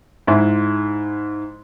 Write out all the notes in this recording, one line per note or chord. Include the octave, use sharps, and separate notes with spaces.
G#2 E4